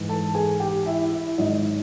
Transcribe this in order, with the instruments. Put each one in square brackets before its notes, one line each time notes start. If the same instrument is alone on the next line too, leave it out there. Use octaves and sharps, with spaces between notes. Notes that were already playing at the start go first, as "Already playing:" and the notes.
Already playing: [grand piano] G#2 E3
A4 A5
G#4 G#5
G4 G5
E4 E5
E4 E5
G#2 D#3 F#3 D#4 D#5